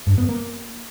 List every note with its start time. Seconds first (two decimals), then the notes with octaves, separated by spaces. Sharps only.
0.07 G2
0.18 B3
0.29 A#3